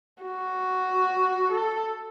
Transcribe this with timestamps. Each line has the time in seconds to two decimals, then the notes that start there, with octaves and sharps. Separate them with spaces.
0.23 F#4
1.52 A4